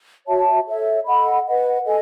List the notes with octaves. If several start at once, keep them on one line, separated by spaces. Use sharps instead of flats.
F#4 C#5 E5 A5
A4 C#5 E5
A4 D#5 F#5 B5
B4 D#5 F#5
A4 D#5 G#5